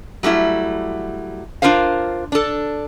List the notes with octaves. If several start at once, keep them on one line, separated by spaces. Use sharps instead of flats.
F#3 G3 A3 E4
D4 F4 A#4 C5 F5
D4 A4